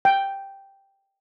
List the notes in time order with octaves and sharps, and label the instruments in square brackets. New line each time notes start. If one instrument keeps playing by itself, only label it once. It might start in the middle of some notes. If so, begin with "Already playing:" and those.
[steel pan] G5